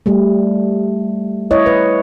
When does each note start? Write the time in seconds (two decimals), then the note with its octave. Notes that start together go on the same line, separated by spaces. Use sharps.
0.06 G3 A3
1.51 E4 C#5 D#5
1.66 B4